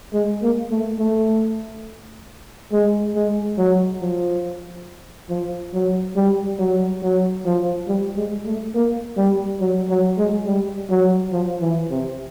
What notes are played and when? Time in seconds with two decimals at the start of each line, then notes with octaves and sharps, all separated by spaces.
0.14 G#3
0.42 A#3
0.71 A3
0.99 A3
2.72 G#3
3.15 G#3
3.58 F#3
4.01 F3
5.30 F3
5.73 F#3
6.16 G3
6.59 F#3
7.03 F#3
7.45 F3
7.88 G3
8.17 G#3
8.45 A3
8.75 A#3
9.17 G3
9.60 F#3
9.89 F#3
10.18 G#3
10.46 G3
10.90 F#3
11.32 F3
11.61 E3
11.90 C3